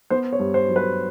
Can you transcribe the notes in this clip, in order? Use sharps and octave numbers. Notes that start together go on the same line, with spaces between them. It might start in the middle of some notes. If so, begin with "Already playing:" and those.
B3 C5
C#5
G2
C5
F#3
B4